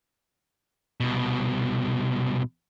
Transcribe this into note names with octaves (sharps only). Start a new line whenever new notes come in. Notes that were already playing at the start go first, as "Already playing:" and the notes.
C2 B2